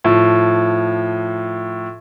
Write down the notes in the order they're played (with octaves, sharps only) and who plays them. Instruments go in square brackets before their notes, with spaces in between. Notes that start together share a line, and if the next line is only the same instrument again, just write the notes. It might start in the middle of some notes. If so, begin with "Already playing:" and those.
[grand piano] A2 F3